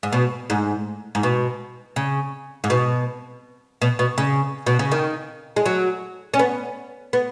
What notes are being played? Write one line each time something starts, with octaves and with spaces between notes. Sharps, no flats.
G#2
B2
G#2
G#2
B2
C#3
G#2
B2
B2
B2
C#3
B2
C#3
D#3
G#3
F#3
C#4
B3
B3